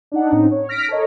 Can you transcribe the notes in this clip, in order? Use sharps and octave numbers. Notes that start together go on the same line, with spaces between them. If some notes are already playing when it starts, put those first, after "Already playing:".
D4 D#4 F#5
A2 C4 C#4 D#4
C#5
F6 A#6 B6 D7
A4 A#4 C#5 D#5